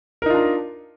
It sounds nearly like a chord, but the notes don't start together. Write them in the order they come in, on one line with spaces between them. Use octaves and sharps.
A#4 D#4 F4 D4